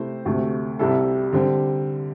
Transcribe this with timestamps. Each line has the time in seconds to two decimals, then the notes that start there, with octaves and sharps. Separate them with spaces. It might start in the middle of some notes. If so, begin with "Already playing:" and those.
Already playing: C3 A3 C4 E4 C5
0.25 D2 C3 A3
0.79 C2 C3 G3 E4 A4
1.33 D3 G3 C4